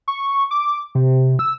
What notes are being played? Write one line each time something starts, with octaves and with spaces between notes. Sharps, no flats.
C#6
D6
C3
E6